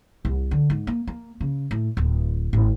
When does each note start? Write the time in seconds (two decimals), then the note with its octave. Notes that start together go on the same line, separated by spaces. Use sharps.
0.25 C2
0.51 D3
0.70 G#2
0.87 A#3
1.07 A#3
1.41 C#3
1.71 A2
1.97 D1
2.53 G#1